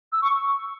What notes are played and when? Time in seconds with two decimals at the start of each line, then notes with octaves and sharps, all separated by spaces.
0.12 E6
0.22 C#6